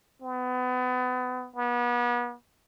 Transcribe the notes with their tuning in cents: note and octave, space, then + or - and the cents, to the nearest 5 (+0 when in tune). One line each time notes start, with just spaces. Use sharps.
B3 +30
B3 -35